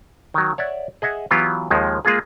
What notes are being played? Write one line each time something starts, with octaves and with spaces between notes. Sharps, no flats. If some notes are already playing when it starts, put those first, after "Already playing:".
D#3 F#3
C#5 D5 E5 F#5
G#4 D#5 E5 F#5
E3 F#3 B3 F4 G4
D#2 D#3 F3 G#3
G#3 A#3 F4 G#4